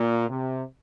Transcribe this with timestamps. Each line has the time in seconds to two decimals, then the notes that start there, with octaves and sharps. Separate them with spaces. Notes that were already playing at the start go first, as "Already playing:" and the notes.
Already playing: A#2
0.29 C3